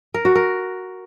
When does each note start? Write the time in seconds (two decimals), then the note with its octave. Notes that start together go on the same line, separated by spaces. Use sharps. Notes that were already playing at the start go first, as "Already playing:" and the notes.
0.14 A#4
0.25 F#4
0.35 A#4